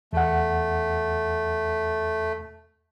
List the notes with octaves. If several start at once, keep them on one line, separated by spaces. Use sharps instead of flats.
E2 A3 F#5